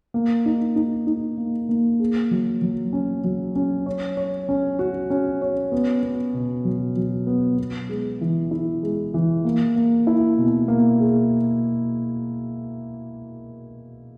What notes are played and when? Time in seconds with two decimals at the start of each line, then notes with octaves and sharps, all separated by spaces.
0.14 A#3
0.46 D#4
0.76 D#4
1.07 D#4
1.38 A#3
1.69 A#3
2.00 G#4
2.31 F#3
2.62 F#3
2.93 C#4
3.24 F#3
3.56 C#4
3.86 C#5
4.17 C#5
4.49 C#4
4.79 F#4
5.10 C#4
5.42 C#5
5.72 B3
6.03 B3
6.34 B2
6.65 F#3
6.96 F#3
7.27 B3
7.59 B3
7.89 G#3
8.21 E3
8.51 E4
8.83 G#3
9.14 E3
9.45 A#3
9.76 A#3
10.07 E4
10.38 B2
10.68 A#3
11.00 G#4